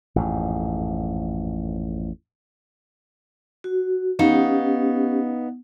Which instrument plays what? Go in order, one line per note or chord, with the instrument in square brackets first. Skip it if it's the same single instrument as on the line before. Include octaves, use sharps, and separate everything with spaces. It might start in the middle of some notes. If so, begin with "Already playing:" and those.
[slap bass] A1 F2 G#2
[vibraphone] F#4
[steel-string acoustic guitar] B3 D#4 F5 [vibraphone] C#4 G4